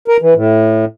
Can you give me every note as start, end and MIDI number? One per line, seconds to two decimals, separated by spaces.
0.08 0.17 70
0.22 0.34 52
0.35 0.85 45